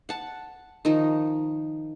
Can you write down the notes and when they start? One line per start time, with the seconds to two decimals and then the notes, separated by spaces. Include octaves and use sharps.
0.09 F#5 A5
0.85 D#3 F3 D#4